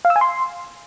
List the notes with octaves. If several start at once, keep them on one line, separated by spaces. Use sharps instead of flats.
F5
E6
G#5
C6